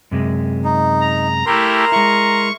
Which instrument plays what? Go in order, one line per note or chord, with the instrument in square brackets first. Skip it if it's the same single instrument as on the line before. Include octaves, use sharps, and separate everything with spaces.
[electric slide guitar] F#2 C3 G#3
[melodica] D#4
[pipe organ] A#5
[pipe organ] A3 E4 G4 [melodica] A#4 A#5 C6
[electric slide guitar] G#3 E4 [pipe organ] C#6